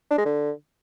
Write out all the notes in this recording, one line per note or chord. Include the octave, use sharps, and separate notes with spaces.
D4
G#3
D3